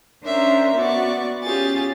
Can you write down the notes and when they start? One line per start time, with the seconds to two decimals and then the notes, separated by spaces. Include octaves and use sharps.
0.23 C#4 D4 A#4 C5 E5 A#5
0.76 B3 F#4 D5 C#6
1.43 C#4 F4 G4 G#4 A6